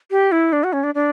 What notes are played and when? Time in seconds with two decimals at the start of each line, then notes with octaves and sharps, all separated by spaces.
0.11 G4
0.32 E4
0.53 D4
0.64 F#4
0.73 C#4
0.83 D4
0.95 D4